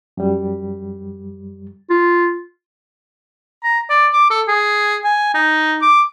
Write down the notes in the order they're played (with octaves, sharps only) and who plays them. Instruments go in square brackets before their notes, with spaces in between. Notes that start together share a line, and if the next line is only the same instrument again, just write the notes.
[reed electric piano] F#2 G3
[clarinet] F4
[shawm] A#5
D5
D6
A4
G#4
G#5
D#4
D6